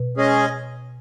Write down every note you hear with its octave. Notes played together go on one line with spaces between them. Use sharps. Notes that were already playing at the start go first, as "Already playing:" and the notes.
Already playing: B2
G#3 C#4 G#4 D#5